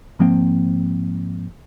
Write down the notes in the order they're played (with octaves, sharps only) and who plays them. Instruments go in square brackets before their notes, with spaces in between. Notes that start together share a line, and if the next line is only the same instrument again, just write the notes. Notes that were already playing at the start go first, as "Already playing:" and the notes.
[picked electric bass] G#2 F3 A#3 C4